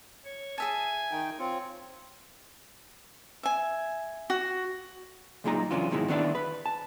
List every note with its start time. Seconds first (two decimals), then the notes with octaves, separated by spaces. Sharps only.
0.25 C#5
0.58 G#4 E5 G#5 A5
1.12 D#3 D#4 G5
1.39 C4 F4 C#5
3.43 E5 G#5
4.30 F#4
5.44 C#2 F#2 A#2 G#3 D#4 A#5
5.71 F#2 C#3 E3 C#4 D4 F4
5.91 G#2 B2 D#3 G#3 E4
6.08 D#3 B3 D4 E4 D5
6.35 B4
6.66 A5